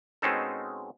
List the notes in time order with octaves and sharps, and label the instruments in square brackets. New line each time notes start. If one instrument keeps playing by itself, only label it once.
[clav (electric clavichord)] B2 G#3 C4 C#4 D#4 A4